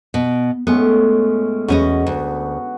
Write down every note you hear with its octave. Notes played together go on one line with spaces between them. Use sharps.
B2
A2 G#3 B3 C#4
E2 B3 C#4 F#4 D#5
D2